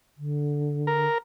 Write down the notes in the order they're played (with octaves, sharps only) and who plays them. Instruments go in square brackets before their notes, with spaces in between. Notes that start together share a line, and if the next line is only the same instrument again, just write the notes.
[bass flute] D3
[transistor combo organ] A#4